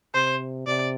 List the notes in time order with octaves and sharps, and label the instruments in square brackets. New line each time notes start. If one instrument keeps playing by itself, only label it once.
[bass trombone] C3 [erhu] C5
[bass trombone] C3 [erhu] D5